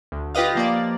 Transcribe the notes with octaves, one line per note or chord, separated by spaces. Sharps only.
D2
F4 G4 B4 D#5 F5
F3 A#3 D5